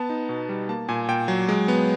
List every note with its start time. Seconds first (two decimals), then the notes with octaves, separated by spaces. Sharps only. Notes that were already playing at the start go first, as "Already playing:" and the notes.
Already playing: B3 A5
0.10 D#4
0.29 B2
0.49 G3
0.69 A#3 A5
0.89 A#2 G#5
1.08 A#2 G5
1.28 F#3
1.49 G#3
1.68 B3